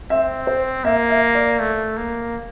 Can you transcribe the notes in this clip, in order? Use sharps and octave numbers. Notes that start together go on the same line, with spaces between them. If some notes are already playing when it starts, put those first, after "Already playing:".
C4 E5
C5
A#3 E5
E5
D5
A3
A#3